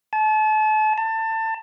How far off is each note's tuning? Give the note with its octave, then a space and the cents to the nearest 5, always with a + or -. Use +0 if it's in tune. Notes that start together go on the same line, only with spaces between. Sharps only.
A5 -35
A5 +25